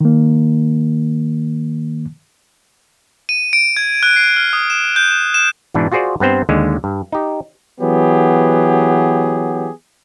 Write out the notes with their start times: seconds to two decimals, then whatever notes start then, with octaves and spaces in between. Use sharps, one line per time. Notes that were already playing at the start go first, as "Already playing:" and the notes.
0.01 D#3 A#3
3.29 D#7
3.53 D7
3.77 G#6
4.03 F#6
4.16 C7
4.36 F6
4.53 D#6
4.70 E7
4.96 G6
5.11 E7
5.34 E7
5.74 G#2 B2 E3 D4
5.92 F4 F#4 G#4 C5 D5
6.20 G2 B3 C4 C5
6.49 D#2 D3 G#3
6.84 G2
7.12 D#4 G4
7.81 E3 F#3 B3 G4 G#4